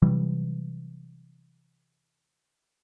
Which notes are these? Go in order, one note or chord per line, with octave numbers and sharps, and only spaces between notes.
C3 E3 F#3 G3